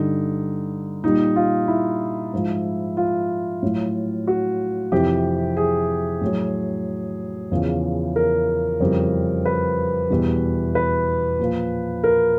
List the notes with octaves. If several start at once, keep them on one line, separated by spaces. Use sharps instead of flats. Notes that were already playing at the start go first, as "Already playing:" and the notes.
Already playing: G2 D3 G3 D#4
A#2 G3 D#4
F4
E4
G#2 F3
F4
A2 F#3
F#4
F2 C3 E3 G4
G#4
A2 F#3
E2 C#3 F3
A#4
F2 C#3 E3 G3
B4
E2 B2 G3
B4
A#2 F3
A#4